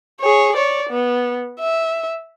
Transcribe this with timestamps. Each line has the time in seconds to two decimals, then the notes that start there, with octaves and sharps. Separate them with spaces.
0.20 G#4 C#5
0.56 C#5 D5
0.90 B3
1.60 E5